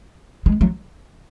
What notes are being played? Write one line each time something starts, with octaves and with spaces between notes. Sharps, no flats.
G#3
F#3